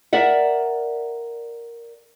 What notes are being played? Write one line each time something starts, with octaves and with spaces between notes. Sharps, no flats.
A#4 D5 E5 F#5